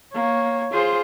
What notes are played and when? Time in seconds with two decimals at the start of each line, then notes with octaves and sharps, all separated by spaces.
0.14 A#3 C#5
0.73 F4 G#4 C5